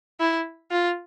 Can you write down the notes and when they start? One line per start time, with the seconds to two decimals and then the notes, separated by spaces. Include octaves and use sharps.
0.20 E4
0.71 F4